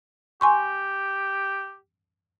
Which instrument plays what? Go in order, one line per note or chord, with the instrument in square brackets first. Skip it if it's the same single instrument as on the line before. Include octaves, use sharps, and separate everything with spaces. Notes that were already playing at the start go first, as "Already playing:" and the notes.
[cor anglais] G4 [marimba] G#5 C6 C#6